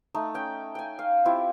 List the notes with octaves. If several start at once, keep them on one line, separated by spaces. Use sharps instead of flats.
A3 D#4
C#4 G5
G5 G#5
F5
C4 E4 F4 G4